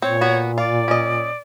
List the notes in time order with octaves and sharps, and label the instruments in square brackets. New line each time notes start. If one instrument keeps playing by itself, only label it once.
[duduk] A#2 [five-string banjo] C4 [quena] C#5
[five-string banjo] B3 F#4
[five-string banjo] F4 [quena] D5
[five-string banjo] C#4 D#5